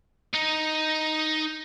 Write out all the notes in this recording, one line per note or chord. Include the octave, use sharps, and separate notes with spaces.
D#4